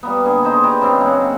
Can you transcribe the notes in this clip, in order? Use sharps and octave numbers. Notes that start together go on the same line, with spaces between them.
G3 A#3 B3
D3 G#4
D#4 C5
G4 B4 D5
F#2 C#3 C4 G#4
A#3 F#5